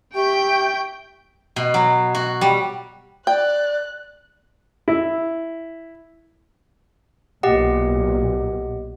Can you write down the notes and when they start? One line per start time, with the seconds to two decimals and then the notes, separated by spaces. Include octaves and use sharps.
0.14 G4 E5 G5 C#6 G6
1.56 B2
1.74 F#3
2.15 F#4
2.41 G3
3.27 D5 G5 F#6
4.88 E4
7.43 B1 A#2 G4 D#5 F#5